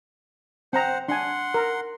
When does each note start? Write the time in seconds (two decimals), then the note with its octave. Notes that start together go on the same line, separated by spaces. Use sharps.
0.73 C4 C5 F#5 A#5
1.08 D4 F#5 G#5 C6
1.54 A#4